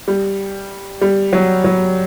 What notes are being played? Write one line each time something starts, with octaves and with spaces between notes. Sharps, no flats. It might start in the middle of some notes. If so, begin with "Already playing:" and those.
G3
G3
F#3
F#3